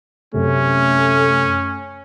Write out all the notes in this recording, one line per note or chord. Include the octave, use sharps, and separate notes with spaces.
F#2 C3 A3 C#4